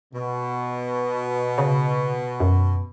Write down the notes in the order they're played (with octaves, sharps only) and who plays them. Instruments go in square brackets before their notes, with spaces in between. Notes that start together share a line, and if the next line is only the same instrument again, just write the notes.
[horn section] B2
[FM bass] C#3
F#2